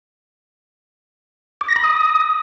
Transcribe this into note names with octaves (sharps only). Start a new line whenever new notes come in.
D6
A#6
B5
D#6